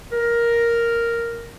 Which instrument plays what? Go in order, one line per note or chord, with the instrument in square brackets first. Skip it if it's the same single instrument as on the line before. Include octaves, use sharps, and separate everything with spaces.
[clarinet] A#4